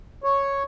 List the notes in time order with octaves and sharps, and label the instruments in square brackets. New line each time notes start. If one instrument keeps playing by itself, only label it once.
[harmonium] C#5